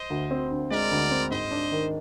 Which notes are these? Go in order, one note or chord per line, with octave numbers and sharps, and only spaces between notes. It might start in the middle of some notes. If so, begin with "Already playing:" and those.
Already playing: C5 D#5
D2
C4
D3
G#3 A#4 D5
D2
C4
G#2 C5 D#5
D4
D#3